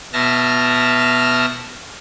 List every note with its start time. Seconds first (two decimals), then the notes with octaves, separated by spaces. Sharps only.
0.13 B2 E5 A5 F6 A#6